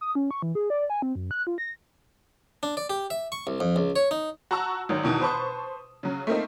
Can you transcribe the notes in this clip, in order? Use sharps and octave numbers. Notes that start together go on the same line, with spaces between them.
D#6
C#4
C#6
E3
G#4
D5
G#5
C4
F#2
F#6
F4
A#6
D4
D5
G4
E5
C#6
C2
F2
C#2
C#5
D#4
F#4 A5 A#5 C#6 E6
G#1 D#3 F#3
E2 B2 D#3 E3
B4 C5 A5 C#6 D#6
C#3 F#3
A3 A#3 C4 D#4